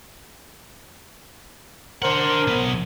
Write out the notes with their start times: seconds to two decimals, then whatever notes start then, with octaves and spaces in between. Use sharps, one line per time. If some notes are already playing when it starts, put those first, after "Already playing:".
2.02 D4 A#4 C5 F#5
2.47 B1 B3